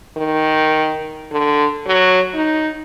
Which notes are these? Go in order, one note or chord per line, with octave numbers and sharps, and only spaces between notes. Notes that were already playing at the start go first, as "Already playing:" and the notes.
D#3
D3
F#3
D#4